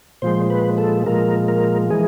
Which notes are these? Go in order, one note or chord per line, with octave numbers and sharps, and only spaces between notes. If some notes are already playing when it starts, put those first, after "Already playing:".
A#2 F3 G#3 C5
B4
A4
A#2 F3 G#3 A#4
A#4
E3 G#3 G#4